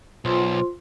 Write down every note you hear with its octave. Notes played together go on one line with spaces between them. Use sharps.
B1 F4 C5 C6